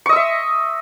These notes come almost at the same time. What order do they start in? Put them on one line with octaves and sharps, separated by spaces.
C#6 D#5 E6 E5